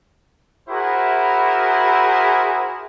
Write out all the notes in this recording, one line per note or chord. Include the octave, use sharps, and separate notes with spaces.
E4 F#4 G#4 A#4 C5 B5